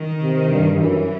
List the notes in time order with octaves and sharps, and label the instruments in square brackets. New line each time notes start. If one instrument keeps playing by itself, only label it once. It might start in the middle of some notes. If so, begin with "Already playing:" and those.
Already playing: [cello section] D#3
[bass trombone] C3
G2
[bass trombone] F#2 [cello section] E3